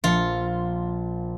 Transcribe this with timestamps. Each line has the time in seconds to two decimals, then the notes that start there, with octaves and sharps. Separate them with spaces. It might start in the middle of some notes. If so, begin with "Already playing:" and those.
0.04 A#1 F4 C#7